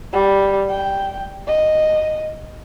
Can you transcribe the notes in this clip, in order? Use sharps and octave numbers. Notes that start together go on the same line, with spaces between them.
G3
G5
D#5